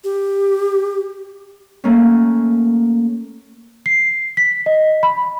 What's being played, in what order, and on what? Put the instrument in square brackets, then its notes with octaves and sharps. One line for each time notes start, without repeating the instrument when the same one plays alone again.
[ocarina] G4
[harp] A3 A#3 C#4
[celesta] C7
B6
D#5
B5